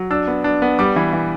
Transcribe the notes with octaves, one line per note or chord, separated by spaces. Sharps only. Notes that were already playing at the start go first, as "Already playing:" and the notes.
Already playing: F#3
D4 E6
B3
D4
B3
G3 D6
E3
E3